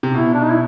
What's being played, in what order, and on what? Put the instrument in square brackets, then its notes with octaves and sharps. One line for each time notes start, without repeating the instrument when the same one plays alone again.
[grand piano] C3
[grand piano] B2 [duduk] E4
[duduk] D4
D#4
E4